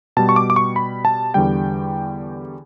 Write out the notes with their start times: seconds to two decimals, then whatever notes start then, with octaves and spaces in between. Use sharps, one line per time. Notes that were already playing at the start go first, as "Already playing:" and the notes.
0.17 B2 G3 A5
0.29 C#6
0.36 D6
0.50 D6
0.56 C#6
0.76 B5
1.05 A5
1.34 E2 D3 G3 G5